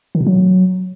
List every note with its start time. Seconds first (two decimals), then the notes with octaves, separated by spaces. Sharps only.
0.15 D#3
0.21 B2
0.27 F#3